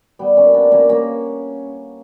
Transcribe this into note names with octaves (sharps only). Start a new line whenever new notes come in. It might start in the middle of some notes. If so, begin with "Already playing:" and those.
G3 B3
A#3 C#4
B3 D4
A#3 C#4
A#3 C#4